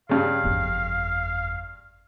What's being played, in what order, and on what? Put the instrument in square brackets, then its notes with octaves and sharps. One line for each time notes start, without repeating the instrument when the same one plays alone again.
[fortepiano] G2 C#3 [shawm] F5
[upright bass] G1 F2